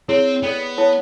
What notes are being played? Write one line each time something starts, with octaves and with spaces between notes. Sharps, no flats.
C4 E4 G#4 C#5
B3 A4 D5 G5
E4 A4 C#5 F#5 A5